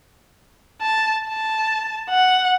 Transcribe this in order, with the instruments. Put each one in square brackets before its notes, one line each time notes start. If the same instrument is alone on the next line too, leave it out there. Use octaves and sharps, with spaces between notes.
[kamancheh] A5
A5
F#5